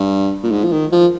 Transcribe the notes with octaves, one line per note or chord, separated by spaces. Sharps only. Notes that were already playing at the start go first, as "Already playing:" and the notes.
Already playing: G2
A#2
G#2
F3
D#3
F3